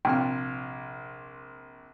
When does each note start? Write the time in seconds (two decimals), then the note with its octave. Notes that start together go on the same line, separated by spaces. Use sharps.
0.05 A#1 C3 G5 F6